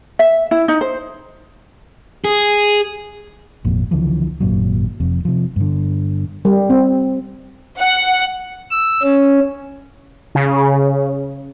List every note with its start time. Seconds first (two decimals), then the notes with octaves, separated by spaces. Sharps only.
0.19 E5
0.51 E4
0.68 D#4
0.81 C5
2.25 G#4
3.65 G#1 F2 A#2
3.91 C#2 D3 E3 F3
4.40 G#1 F#2 A#2 F#3
5.00 F1 F2 C3
5.25 C3 F3
5.56 G2 D3
6.45 G3
6.70 C4
7.79 F#5
8.71 E6
9.03 C#4
10.35 C#3